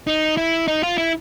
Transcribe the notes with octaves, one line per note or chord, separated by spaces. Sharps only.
D#4
E4
D#4
F4
E4